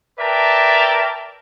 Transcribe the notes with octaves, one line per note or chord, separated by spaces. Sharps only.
A#4 B4 D5 E5 G5 A5